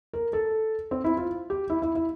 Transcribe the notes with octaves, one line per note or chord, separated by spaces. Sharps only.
A#4
A4
C4
E4
F4
G4
E4
E4
E4